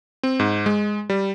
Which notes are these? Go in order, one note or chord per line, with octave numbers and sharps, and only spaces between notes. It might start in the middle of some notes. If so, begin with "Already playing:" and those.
C4
G#2
G#3
G3